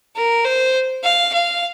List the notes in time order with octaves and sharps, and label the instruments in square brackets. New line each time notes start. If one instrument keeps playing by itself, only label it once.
[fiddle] A#4
C5
F5
F5